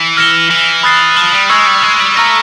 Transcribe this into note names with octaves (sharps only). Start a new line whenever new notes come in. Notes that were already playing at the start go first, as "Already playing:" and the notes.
Already playing: E3
F6 A#6 C#7 E7 G7
E3
B5 D#6 F#6 A6 C7
F3
G3
G#3 C#6 E6 G#6 C#7 F#7
G3
G#3
G3
A3 A#5 C#6 F6 A#6